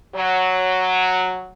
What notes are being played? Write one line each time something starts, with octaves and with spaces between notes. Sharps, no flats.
F#3